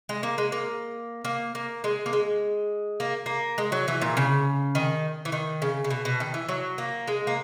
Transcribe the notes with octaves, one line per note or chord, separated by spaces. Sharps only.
G#3
A#3
G#3
A#3
A#3
A#3
G#3
A#3
G#3
A#3
A#3
G#3
F#3
E3
A#2
C#3
D#3
E3
D#3
C#3
C#3
B2
B2
D#3
E3
F#3
A#3
G#3
A#3